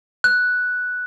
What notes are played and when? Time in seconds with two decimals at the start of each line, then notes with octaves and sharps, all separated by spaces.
0.24 F#6